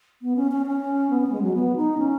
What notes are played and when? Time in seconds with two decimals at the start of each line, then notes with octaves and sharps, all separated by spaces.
0.22 B3
0.36 C#4
0.51 C#4
0.66 C#4
1.10 B3
1.21 C#4
1.27 B3
1.32 G#3
1.42 F#3
1.54 B3
1.76 D#4
1.98 C#4